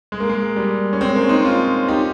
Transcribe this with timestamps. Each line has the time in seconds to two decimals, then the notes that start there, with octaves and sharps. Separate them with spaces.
0.12 G#3
0.20 A#3
0.29 G#3
0.56 G3
0.93 C#4
1.01 G#3 C4
1.15 A#3 C#4
1.29 C4 D#4
1.44 C#4 F4
1.88 D#4 G4